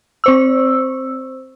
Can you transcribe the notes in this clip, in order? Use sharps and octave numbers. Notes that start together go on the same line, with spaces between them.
C4 C5 E6